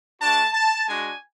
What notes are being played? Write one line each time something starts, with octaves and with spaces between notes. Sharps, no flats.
A3 D4 F#4 A5
A5
G#3 D4 F#4 G#5